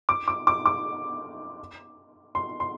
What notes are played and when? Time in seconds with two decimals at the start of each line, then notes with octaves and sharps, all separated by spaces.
0.09 D6
0.28 D6
0.47 D6
0.66 D6
2.35 C6
2.60 C6